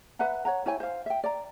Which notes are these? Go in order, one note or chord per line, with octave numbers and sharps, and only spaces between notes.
B4 E5 F#5 A#5
C#5 F#5 A#5
E4 C#5 G5 G#5
C5 F5
E5 G5
D5 A#5